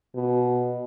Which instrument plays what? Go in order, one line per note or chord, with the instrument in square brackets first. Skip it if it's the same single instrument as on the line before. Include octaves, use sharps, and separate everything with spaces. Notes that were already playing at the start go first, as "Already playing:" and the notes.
[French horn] B2